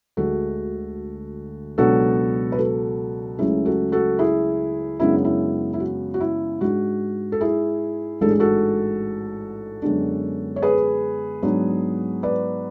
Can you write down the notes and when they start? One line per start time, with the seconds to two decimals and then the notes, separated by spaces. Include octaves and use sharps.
0.17 D2 D3 G#3 F#4 A4
1.78 C#2 B2 F#3 B3 D4 F#4 A4
2.52 B4
2.59 F#4 A4
3.38 C#2 C#3 F#3 A3 C#4 E4 G#4
3.65 F#4 A4
3.92 F#4 A4
4.19 E4 G#4
5.00 F#2 C#3 G#3 B3 D4 E4
5.24 E4
5.73 E4
5.80 F#4
6.14 F#4
6.20 E4
6.61 G#2 G#3 D4 F#4
7.32 A4
7.41 E4 G#4
8.21 A1 G#2 G#3 D4 A4
8.30 G#4
8.40 F#4 A4
9.82 F#2 D3 G#3 B3 D4
10.56 C#5
10.62 G#4 B4
11.42 G#2 F#3 B3 D4
12.23 B4 D5